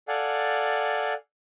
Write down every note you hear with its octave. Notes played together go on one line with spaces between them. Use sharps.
A4 D5 F5 F#5 G#5